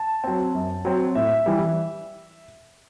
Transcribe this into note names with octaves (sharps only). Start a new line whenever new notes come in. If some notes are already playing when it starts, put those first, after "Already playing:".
Already playing: A5
F#3 C4
F#2
F#3 C4
A2 E5
E3 G3